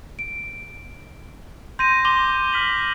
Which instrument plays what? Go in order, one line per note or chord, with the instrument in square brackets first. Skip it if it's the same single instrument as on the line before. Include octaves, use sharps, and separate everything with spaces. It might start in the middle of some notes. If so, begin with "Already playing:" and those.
[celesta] D7
[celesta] C6 [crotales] G6 A#6 D#7
[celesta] C6 [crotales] D6 D#7 G7
[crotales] F6 B6 F#7